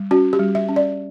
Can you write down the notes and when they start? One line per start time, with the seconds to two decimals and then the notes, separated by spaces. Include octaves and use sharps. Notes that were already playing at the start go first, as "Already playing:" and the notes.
Already playing: G3
0.11 C#4 F#4
0.33 G4
0.39 G3
0.55 E5
0.69 C#4
0.76 D5